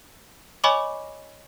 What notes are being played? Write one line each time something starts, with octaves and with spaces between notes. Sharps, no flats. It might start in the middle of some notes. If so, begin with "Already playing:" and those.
C#5 D#5 G#5 B5 C#6 D6